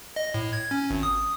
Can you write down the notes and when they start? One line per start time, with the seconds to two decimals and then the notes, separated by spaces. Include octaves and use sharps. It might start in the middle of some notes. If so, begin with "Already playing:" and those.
0.16 D#5
0.34 A2
0.53 G#6
0.71 C#4
0.90 G#1
1.03 D#6